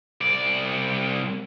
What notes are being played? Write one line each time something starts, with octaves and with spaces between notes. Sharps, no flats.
C2 D5